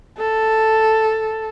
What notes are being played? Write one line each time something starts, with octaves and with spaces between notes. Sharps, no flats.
A4